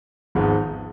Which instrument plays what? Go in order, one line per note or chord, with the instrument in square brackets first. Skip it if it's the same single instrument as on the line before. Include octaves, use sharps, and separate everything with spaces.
[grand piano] G#1 G#2 F3 G#3 B3